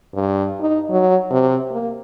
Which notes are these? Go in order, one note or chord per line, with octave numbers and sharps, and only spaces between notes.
G2
D#4
F#3
C3
A#3